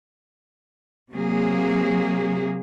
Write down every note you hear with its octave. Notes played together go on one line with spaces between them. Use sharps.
C3 F#3 A#3 G#4